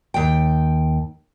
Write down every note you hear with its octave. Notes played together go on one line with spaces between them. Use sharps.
D#2 G5